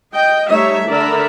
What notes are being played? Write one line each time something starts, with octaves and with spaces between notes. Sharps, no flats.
D#5 G5
G3 A3 D#4 C#5 E5
D3 A#4 D5 E5 B5